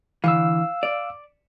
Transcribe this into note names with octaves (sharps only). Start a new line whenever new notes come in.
D3 E3 F5 E6
D5